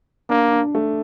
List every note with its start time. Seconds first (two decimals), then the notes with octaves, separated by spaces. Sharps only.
0.30 A#3 D4
0.52 D4
0.75 A3